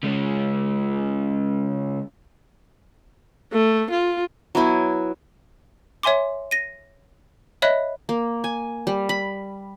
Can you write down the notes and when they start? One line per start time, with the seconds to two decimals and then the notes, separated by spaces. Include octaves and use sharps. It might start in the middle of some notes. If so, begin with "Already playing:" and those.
0.03 C#3 G#3
3.53 A3
3.91 F4
4.55 F#3 B3 E4 G#5
6.03 C#5 E5 G#5 C6 D6
6.51 A#6 D#7
7.62 C#5 D#5 E5 B5 F#6
8.09 A#3
8.44 G#5
8.87 G3
9.09 B5